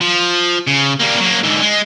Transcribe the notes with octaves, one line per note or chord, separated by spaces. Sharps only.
F3
C#3
G3 A#3
F#3 A#3
G#2 D3
G#3